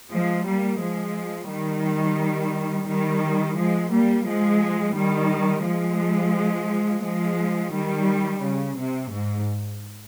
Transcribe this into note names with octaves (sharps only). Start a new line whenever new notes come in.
F3 G#3
G3 A#3
F3 G#3
D#3 G3
D#3 G3
F3 G#3
G3 A#3
F3 G#3
D#3 G3
F3 G#3
F3 G#3
D#3 G3
C#3
C3
G#2